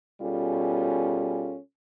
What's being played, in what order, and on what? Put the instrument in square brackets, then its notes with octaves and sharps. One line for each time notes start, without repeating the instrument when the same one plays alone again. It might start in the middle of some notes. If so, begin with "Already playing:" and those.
[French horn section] B2 G3 C#4 F4 G#4 A4